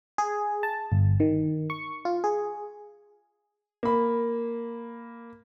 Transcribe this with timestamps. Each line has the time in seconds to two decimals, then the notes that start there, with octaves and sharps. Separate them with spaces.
0.18 G#4
0.63 A5
0.92 G1
1.20 D#3
1.70 C#6
2.05 F4
2.24 G#4
3.83 A#3 B5